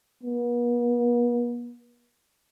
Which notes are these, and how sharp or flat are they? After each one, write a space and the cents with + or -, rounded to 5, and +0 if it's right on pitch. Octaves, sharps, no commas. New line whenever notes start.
B3 -45